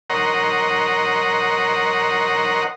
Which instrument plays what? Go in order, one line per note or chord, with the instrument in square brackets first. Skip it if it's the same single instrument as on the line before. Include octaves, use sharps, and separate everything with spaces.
[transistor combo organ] A#4 C#5 D#5 F#5 A#5 C6